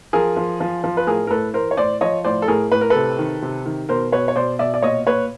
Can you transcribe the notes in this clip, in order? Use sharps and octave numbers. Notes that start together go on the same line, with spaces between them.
F3 G#4 A#4
F3
F3
F3
B4
A2 G#4 A#4
A#4
A2 A4 B4
E3 A#4 C5
C#5
A2 C5 D5
F3 C#5 D#5
A2 C5 D5
A4
A2 G#4 A#4
A2 B4
A#4
C3 A4 B4
D#3
C3
D#3
B2 A#4 C5
B2 B4 C#5
C#5
B2 C5 D5
B2 D5 E5
D5
A#2 C#5 D#5
A#2 B4 C#5